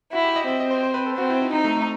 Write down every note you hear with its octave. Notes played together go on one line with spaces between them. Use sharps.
E4 F#4
G4
D#5
C4 E5
D#5
C5
C5
B4
A4
C4 F#4
E4
D#4
C4 D#4
A3
A3